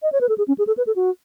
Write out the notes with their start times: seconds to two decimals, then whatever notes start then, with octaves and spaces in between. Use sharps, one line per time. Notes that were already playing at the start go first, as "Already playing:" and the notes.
0.03 D#5
0.12 C#5
0.21 B4
0.29 A4
0.38 G#4
0.48 C#4
0.58 G#4
0.67 A4
0.77 B4
0.87 A4
0.96 F#4